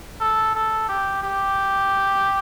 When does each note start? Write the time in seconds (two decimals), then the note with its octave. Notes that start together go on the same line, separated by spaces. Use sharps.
0.20 A4
0.55 A4
0.89 G4
1.23 G4